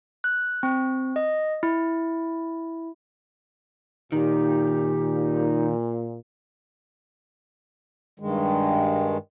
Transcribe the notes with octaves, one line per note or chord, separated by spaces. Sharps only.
F#6
C4
D#5
E4
A#2 D#3 D#4 G4
G2 D#3 G#3